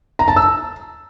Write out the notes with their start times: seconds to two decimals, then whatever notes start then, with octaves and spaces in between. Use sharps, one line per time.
0.19 A#5
0.28 A5
0.36 E6